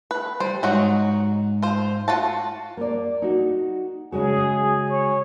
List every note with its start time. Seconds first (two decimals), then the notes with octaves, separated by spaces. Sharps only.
0.11 B4
0.40 G3 C5
0.63 G#2 F#3 D#4 F#4
1.62 F4 C5
2.08 F4 F#4 A5
2.77 A#3 D5
3.22 D#4 F#4
4.12 C#3 G#3 F#4 G#4
4.89 C#5